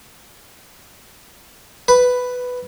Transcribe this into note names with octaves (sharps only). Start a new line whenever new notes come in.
B4